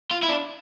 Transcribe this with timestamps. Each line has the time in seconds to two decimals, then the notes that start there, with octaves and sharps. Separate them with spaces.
0.11 F4
0.23 E4
0.29 D4